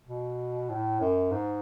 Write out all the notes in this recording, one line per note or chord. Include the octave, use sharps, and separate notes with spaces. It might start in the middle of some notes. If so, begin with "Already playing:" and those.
B2
A2
F#2
G#2